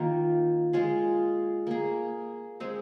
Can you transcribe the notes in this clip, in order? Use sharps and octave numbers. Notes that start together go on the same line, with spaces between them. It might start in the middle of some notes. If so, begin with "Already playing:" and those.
Already playing: D#3 A#3 F4
G#3 F4 G#4
A#3 G#4
G#3 C4 G#4